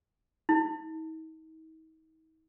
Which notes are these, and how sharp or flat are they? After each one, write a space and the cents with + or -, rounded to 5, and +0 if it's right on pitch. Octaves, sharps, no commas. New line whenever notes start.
D#4 +40